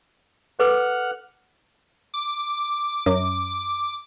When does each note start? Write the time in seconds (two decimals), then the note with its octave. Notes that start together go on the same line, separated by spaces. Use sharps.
0.59 A4 B4 F#5 D6 F6 F#6
2.14 D6
3.06 F#2